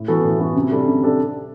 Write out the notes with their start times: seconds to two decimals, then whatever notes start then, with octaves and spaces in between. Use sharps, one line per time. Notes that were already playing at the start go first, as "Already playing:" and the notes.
Already playing: A2
0.08 E3 B3 F#4 A4
0.24 A2
0.40 E3 B3 F#4 A4
0.56 C3
0.71 G3 D4 A4
0.86 C3
1.02 G3 D4 A4